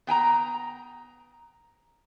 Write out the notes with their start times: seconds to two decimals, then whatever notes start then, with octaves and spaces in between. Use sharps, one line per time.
0.07 B3 G5 G#5 A#5